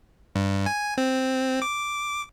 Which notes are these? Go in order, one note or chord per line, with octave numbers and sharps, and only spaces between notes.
G2
G#5
C4
D6